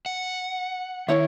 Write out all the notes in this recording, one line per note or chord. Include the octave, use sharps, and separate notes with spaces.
F#5
D#3 E4 C#5 E5